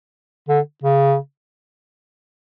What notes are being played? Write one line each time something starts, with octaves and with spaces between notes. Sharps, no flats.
D3
C#3